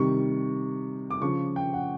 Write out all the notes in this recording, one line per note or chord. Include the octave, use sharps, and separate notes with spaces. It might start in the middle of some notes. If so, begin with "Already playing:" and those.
Already playing: C3 D#3 G3 C#6
D6
C#3 F3 C#6
G5
F#5